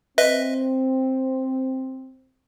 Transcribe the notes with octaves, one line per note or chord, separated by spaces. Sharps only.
C4 B4 D#5 E5